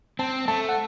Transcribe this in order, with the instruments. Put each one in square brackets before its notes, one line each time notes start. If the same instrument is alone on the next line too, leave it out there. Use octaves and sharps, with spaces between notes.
[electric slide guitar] C4 [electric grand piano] A5
[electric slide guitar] A3 [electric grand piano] A5
[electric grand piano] F#5